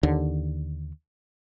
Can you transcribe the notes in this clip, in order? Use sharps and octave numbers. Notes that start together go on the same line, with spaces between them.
D#2 D3